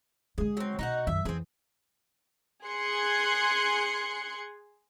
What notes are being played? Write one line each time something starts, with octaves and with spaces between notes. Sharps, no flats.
D3 G#3 G#4
F#3 C4
B2 D#4 F#4 F#5
F#2 D#3 E5
F2 E3 C4 G#4
G#4 C6 F#6 G#6 C#7